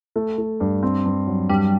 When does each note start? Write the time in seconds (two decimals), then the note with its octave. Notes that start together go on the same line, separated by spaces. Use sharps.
0.16 A3
0.38 A3
0.60 G2
0.83 C4
1.05 G2
1.27 F#3
1.49 G2 G3